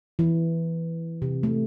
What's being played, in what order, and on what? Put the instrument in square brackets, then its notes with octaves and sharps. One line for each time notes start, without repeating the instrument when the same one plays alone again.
[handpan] E3
C3
A3